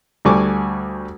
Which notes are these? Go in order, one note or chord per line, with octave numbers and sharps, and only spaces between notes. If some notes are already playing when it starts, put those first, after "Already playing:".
D2 G3 A4 G#5 C#6 D6